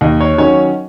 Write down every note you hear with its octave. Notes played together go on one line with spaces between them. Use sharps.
D#2 D#5
C#5
D#3 F#3 C#4 C#5